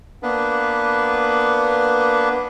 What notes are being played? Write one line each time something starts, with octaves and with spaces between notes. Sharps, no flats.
A#3 B3 D4 B4